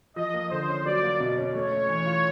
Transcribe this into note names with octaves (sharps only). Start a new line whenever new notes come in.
F3 D#5
A#3
D3 C5
C#4
F#3 D5
A#3
B2
C#4
A3 C#5
C#4
E3
F4